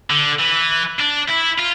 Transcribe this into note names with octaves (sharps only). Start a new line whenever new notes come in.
D3
E3
D4
E4
F4